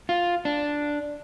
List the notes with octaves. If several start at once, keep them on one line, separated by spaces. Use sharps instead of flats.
F4
D4